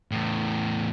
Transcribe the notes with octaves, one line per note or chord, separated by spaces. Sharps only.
E2 A2